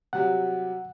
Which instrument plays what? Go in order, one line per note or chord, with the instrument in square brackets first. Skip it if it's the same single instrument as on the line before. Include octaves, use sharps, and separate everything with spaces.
[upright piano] C3 F#3 G3 [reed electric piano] F#5